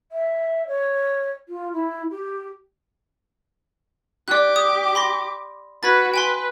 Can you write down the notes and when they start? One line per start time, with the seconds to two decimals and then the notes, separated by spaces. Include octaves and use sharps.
0.12 E5
0.67 C#5
1.48 F4
1.73 E4
2.11 G4
4.28 G4 D5 D6 F#6
4.56 D#6
4.95 B5 C6 A#6
5.83 F#4 B4 B5 G#6 A6
6.14 B4 G5 G#5 C6